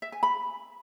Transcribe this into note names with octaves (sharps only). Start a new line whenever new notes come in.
E5
G#5
B5